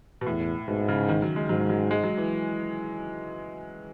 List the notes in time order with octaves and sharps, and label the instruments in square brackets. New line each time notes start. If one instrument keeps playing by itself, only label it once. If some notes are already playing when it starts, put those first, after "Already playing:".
[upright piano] B2
[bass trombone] E2 [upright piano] A2
[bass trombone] G#2 [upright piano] B2
[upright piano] C#3
D#3
F#3
G#3
[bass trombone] G#2 [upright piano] F#3
[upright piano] F#3
G#3
F#3
E3